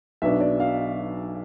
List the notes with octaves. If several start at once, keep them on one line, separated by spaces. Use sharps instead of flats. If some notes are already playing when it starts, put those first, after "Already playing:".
B1 B2 B3 D4 E5
D5
F5